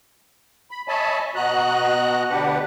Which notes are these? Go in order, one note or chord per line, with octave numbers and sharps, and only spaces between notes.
B5
C#5 D#5 E5 G#5 A5 B5
B2 F#4 D#5 A#5 F#6
D2 B2 D4 G4 B4 F#5